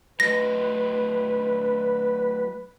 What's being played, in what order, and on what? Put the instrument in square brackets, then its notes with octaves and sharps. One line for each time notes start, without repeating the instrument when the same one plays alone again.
[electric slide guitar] F#3 A3 D#5 [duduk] B4 [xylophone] A#6